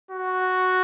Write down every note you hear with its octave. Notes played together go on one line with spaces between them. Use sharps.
F#4